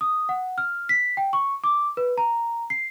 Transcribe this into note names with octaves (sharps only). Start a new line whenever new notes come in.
D#6
F#5
F6
B6
G5
C#6
D6
B4
A#5
C7